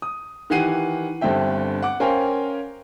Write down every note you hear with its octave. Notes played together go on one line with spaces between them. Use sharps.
D#6
D#3 E3 G4 F#5 C7 D#7
G1 G2 D3 C4 E5 G5
F#5 D6
C#4 A#4 C5 F5 G5 G#5